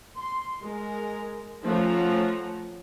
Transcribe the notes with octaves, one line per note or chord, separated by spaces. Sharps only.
C6
G#3 A#4
F3 A3 C#4 F#5 A#5